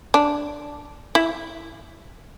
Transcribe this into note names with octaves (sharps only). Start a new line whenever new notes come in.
D4
E4